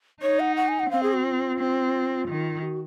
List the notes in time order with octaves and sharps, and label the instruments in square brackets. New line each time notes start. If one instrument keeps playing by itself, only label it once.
[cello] D#4 [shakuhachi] C#5
[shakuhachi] F#5
F#5
G#5
F#5
[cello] C4 [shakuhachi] F5
[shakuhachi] G#4
F#4
F4
[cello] C4
D#3
[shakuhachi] F#4